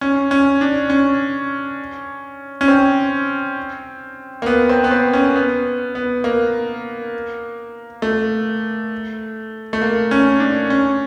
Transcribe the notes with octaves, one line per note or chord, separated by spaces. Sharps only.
C#4
C#4
D4
C#4
C#4
C4
A#3
B3
C4
B3
C4
C#4
B3
B3
A#3
A3
A3
A#3
C#4
D4
C#4